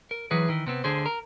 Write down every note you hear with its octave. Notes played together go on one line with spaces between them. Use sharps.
A#4
E3 F#3 G#4 B4
D#3 E3
C3 B3 C4
D2 D3 G#4 C5
A#4